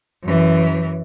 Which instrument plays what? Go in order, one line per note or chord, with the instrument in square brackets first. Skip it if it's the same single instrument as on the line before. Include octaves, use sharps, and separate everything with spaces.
[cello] F#2 E3